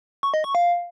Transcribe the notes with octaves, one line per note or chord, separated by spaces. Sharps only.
C#6
D#5
C#6
F5